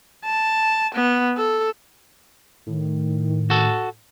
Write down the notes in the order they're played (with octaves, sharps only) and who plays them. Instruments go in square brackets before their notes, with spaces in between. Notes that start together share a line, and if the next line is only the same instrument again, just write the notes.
[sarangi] A5
B3
A4
[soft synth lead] A2 [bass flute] D#3
[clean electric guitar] F#4 A4